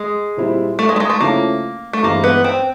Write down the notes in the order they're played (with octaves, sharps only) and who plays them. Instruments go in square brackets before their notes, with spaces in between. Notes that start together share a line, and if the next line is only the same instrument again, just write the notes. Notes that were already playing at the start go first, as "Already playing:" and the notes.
Already playing: [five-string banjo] G#3
[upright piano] A#2 G3 C4 E4
[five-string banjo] A3
G#3
A3
G#3
A3
[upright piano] C#3 F3 A3 C#4 E4 [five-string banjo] A#3
[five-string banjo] A3
[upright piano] G2 E3 G#3 C4 E4 [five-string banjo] A#3
[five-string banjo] B3
C4